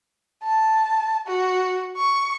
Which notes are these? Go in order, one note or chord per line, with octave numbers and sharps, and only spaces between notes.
A5
F#4
C#6